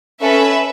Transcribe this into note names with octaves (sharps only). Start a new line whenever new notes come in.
C#4 A4 B4 E5